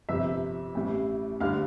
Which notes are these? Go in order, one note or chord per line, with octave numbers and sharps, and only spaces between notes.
G1 F2 C3 E5 E6
A1 A2 G3
D2 D3 G3 F5 F6